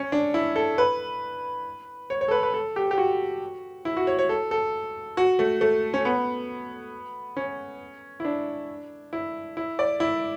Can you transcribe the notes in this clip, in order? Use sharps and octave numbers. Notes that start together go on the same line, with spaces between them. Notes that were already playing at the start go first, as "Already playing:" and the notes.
Already playing: C#4
D4
E4
A4
B4
C#5
C#5
A4
B4
B4
A4
G4
G4
F#4
E4
F#4
C#5
C#5
A4
A4
F#4
A3
A3
C#4
B3
C#4
E4
D4
E4
E4
D5
E4